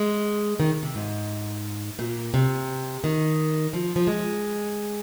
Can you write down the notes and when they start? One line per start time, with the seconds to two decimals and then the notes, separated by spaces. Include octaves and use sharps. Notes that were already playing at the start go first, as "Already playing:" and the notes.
Already playing: G#3
0.60 D#3
0.83 C3
0.95 G#2
1.99 A#2
2.34 C3
3.04 D#3
3.73 F3
3.96 F3
4.07 G#3